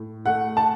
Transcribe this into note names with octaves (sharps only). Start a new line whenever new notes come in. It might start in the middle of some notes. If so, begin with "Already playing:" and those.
Already playing: A2
A3 F#5
A5